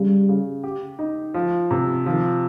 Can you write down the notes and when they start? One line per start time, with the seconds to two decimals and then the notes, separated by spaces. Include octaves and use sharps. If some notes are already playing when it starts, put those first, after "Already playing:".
Already playing: C#3 G3
0.29 C#3
0.63 G4
0.99 D#4
1.34 F3
1.71 C3
2.06 D#3 F3